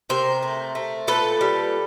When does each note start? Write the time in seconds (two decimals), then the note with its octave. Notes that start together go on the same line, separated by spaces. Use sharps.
0.09 C3 A#4 C5
0.42 A3
0.75 A3
1.07 A#2 A4 B4
1.41 G3